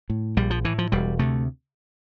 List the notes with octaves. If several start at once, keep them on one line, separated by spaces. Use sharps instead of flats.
A2
A#1 G3
F3
A2 E3
F3
E1 G3
D2 C3 A3